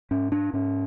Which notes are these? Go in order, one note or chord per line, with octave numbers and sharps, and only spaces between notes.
G#2 C#4
D4
G#2 C#4